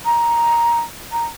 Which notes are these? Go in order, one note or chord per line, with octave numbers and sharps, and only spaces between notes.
A#5
A#5